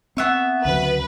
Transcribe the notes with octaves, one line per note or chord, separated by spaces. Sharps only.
B3 C4 E5 C#6
D2 C#3 F#3 B4